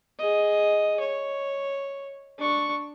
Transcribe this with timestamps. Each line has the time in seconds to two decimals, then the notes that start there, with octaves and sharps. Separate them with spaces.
0.19 G#4 D#5
1.00 C#5
2.39 D4 C#6